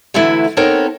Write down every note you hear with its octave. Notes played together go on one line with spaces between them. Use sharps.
D3 E3 F#3 A3 E4
B3 C4 D#4 A4 A#4 C#5